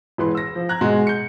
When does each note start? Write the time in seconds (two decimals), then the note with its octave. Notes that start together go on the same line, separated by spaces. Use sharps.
0.18 E1 E3 B4 C6
0.35 E6 A#6
0.55 F3
0.69 A#5 F#6 G#6
0.81 G#2 B2 G#3 F#4 C6
1.07 G6 C#7